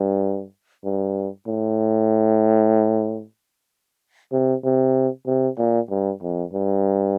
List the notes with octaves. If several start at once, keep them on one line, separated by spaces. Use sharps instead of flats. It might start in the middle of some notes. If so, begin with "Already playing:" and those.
Already playing: G2
G2
A2
C3
C3
C3
A#2
G2
F2
G2